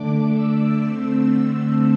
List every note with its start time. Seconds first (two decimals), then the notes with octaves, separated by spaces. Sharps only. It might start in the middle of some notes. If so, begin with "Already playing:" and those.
Already playing: D3 A3 D4 D6
0.34 E6
0.81 D3 A3 C4